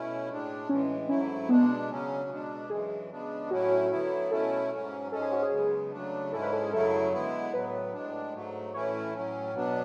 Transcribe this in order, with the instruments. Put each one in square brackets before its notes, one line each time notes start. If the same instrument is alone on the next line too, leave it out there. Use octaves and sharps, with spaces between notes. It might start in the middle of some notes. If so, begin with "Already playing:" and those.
Already playing: [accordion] B2 A3 C#4 E4
A2 G#3 D4
[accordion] A2 E3 G#3 [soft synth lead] C#4
[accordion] G#2 F#3 A3 E4 [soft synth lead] C#4
[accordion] B2 G#3 D4 [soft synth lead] B3
[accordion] C#3 F#3 C#4
B2 G#3 D4
[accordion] F#2 E3 G#3 [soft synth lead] G#4
[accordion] C#3 G#3 B3 D4
[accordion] A2 F#3 A3 C#4 E4 [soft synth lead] F#4
[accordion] D3 F#3 B3 E4
[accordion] B2 A3 C#4 E4 [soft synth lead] A4
[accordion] G#2 F#3 C#4
[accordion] G#2 G#3 C#4 [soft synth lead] A4
[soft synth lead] G#4
F#4
G#4
[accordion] F#2 C#3 G#3 B3
C#3 F#3 A3 D4
[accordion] G#2 G#3 C#4 E4 [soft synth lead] A4
[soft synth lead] B4
A4
G#4
[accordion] F#2 C#3 F#3 A3 E4 [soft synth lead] A4
[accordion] D3 G#3 B3 E4
[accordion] A2 F#3 B3 [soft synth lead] B4
[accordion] A2 G#3 D4
G#2 F#3 A3
[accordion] A2 E3 A3 C#4 E4 [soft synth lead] C#5
[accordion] A2 F#3 C#4
B2 F#3 B3 D4